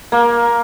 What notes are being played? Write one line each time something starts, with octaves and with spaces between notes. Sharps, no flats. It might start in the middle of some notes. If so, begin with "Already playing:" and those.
A#3